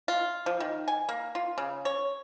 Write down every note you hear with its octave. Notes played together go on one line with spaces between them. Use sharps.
F4
F3
D#3
G#5
A#3
F4
C#3
C#5